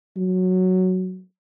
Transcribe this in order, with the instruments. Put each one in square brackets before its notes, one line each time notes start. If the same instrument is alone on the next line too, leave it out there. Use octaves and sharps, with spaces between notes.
[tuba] F#3